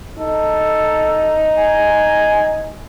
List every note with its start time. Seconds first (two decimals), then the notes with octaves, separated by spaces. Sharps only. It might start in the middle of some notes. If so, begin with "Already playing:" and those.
0.18 D#4 A4
1.58 G#5